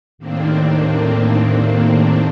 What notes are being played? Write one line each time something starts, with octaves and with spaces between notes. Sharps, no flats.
D#2 A2 D#3 A#3 C4 D4